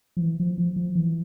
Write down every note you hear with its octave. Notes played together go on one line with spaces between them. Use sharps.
F3
E3
F3
F3
F3
E3